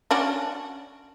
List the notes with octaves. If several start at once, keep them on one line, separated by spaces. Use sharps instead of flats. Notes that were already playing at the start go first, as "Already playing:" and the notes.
C#4 D4 F#4